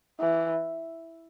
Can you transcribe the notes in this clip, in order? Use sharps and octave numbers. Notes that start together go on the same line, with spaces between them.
E3